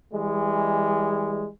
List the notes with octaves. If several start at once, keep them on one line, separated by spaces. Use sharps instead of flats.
E3 G3 G#3